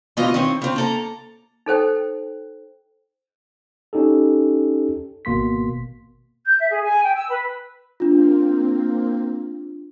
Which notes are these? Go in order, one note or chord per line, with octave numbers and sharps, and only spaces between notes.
D2 B2 E3 F4 D#5
D#3 C4 C#5
C#3 C4
A#3 A4 A#5
D#4 A4 C5 G5
C#4 D#4 G4 A4
G#1 B2 A#3 C6 B6
G6
E5
G#4
G#5
G5
E6
B4
A#3 C4 D4 F4